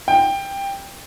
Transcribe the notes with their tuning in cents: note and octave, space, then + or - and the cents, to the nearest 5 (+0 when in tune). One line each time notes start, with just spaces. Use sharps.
G5 +15